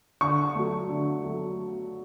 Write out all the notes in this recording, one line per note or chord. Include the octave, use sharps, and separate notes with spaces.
D3 C#6
F#3 A3
D3
F#3 A3